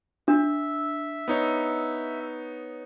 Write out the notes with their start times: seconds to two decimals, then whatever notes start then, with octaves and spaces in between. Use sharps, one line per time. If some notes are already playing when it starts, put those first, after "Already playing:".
0.28 D4 E5
1.28 B3 D#4 C#5